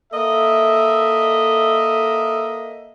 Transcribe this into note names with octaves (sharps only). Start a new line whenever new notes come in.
A#3 A4 D#5 E5